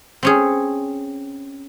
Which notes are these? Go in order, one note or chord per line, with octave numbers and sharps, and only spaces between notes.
C4 C#4 G#4